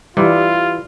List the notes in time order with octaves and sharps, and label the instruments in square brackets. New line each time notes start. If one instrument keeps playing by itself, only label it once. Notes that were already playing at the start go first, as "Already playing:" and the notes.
[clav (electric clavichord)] E3 [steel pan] G3 [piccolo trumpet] F4